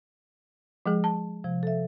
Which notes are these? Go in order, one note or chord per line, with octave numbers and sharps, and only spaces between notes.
F3 G#3 G#4
A5
C3 F3
A4 E5